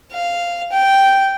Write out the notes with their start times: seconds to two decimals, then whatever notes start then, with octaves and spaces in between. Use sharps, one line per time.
0.12 F5
0.72 G5